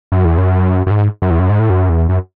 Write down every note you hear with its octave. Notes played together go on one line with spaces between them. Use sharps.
F#2
E2
F#2
F#2
G#2
F#2
E2
F#2
G#2
A2
F#2
E2
F#2